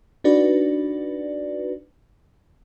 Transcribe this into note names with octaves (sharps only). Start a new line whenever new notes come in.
D4 D#4 F#4 B4 D5